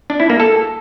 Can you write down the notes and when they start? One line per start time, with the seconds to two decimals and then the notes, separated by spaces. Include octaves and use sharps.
0.10 D4
0.20 E4
0.30 A#3
0.40 A4